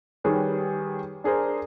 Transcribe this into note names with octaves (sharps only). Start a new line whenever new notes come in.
D#3 G3 G#4 B4 C#5
D4 G#4 A#4 C5